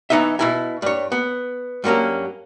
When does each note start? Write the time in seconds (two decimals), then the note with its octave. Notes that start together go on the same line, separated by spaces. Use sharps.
0.10 E3 B3 D#4 D#5 E5
0.39 B2 E4 G#5
0.82 G2 C#5
1.12 B3
1.84 G2 F#3 A#3 C#4